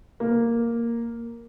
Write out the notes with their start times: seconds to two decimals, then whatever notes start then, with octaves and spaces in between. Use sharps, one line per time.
0.20 A#3